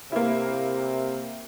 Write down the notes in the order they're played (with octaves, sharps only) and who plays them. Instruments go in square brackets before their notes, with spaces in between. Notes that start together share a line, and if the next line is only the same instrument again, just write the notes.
[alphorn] C3 [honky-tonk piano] A#3 E4